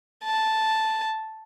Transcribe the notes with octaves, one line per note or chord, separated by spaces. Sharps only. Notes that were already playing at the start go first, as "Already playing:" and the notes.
A5